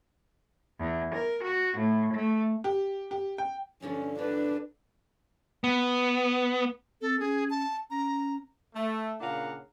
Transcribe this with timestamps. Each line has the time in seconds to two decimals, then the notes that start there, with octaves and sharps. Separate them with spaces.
0.79 E2
1.14 A#4
1.44 F#4
1.78 A2
2.14 A3
2.64 G4
3.11 G4
3.38 G5
3.82 G2 D3 F3 C#4
4.19 D3 D4 B4
5.64 B3
7.01 C4 A4
7.20 C#4 G#4
7.50 A5
7.90 C#4 A#5
8.76 A3
9.20 A#2 C#3 D4 F5 F#5 A#5